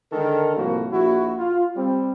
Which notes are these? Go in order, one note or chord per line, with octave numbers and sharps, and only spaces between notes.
D3 D#3 G#3 A4 A#4
C2 A2 F3 A#3 F#4
A#1 E4 F#4
F4
G3 C4